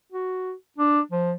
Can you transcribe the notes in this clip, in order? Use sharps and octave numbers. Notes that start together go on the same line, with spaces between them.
F#4
D4
F3